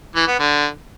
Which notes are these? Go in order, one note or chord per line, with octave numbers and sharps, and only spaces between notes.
E3
B3
D3